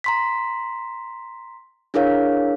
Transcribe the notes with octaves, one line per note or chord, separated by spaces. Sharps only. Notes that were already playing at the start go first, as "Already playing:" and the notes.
A#5 C6 B6
D4 E4 G#4 A#4 C#5 F5